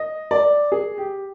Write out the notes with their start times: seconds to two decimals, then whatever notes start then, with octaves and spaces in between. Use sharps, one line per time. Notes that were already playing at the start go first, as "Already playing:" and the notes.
Already playing: D#5
0.31 D5
0.72 G#4
0.98 G4